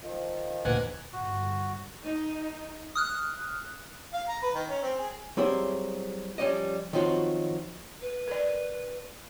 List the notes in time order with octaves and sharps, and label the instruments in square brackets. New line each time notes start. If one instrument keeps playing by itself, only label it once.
[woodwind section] D#3 F3
[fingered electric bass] E1 D2 E3 [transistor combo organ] A#2 F#5 G#5 [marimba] B4
[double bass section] G1 [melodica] F#4
[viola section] D#4
[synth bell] D#6 F6 F#6
[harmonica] F5
A#5
B4
D#3
C#4
C4
G#4
[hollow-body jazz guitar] F#3 G3 C4 E4 G#4
F3 G3 C#4 D5 D#5
D#3 F3 F#3 C4 F4 F#4
[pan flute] B4
[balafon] A#4 D5